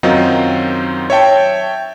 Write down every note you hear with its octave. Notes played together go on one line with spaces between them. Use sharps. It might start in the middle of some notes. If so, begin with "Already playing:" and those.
F#2 D#3 F#3 C4 D#4 F4
C#5 E5 G5 A5